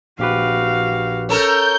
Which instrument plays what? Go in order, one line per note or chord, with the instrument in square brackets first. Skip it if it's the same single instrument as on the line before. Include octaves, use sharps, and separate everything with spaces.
[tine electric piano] A#1 G4 B4 [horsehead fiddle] F#4 F5
[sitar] C#4 A4 A#4 [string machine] G6